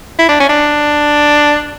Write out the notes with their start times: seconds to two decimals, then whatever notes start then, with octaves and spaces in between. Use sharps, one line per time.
0.19 E4
0.29 D4
0.40 C#4
0.49 D4